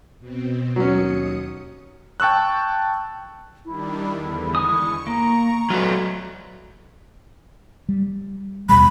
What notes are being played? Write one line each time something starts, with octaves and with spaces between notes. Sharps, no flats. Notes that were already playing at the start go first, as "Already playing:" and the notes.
B2 C4
D#2 F#3 C#4 D#6 C#7
G5 A5 C#6 E6 F#6
D#3 G3 D4 E4
E2 D3
G#3 G#5 C#6 D#6
A#3 A#5
F#3 A3 F4 B4
G3
D#2 B2 G3 B5